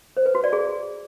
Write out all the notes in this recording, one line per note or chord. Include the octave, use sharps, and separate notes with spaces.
C5
B4
F#4
D5
G#4